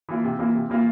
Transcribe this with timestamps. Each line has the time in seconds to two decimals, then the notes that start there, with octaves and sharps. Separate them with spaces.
0.09 E3 A#3 F4
0.24 C3
0.39 E3 A#3 F4
0.54 C3
0.70 E3 A#3 F4